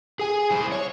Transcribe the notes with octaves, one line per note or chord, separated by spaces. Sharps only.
G#4 G#5
E4 C5
C#5